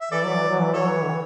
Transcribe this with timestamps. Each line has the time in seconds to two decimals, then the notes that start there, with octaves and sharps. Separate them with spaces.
0.01 E5
0.11 E3 A4 D5
0.24 F#3
0.36 E3
0.49 F#3
0.61 E3
0.73 F#3 E4 A4 C#5
0.86 E3
1.03 D3
1.10 E3